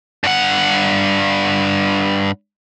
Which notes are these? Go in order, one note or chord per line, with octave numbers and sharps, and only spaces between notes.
G2 F#5